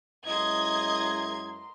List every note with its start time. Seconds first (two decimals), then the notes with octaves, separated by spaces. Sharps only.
0.27 F#2 G#3 E4 D#5 A#5 C6 G#6